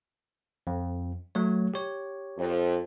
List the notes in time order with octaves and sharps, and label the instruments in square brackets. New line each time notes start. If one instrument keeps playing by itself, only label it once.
[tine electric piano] F2
F#3 A3 C#5
G4 C#5
[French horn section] F2